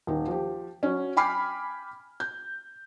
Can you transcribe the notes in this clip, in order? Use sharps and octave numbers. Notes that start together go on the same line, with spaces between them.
D#1 D#4
F3 G4
F#3 C#4
G5 G#5 B5 D6 F6 C7
G6